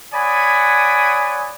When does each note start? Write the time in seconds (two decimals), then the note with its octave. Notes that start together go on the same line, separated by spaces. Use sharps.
0.14 C#5 D5 F#5 G#5 B5 D#6